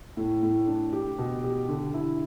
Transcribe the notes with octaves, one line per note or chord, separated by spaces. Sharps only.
A2
A2
D4
G4
B2
G4
D3
E4